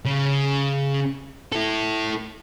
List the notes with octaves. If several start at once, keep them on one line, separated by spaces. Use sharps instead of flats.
C#3
E4 A4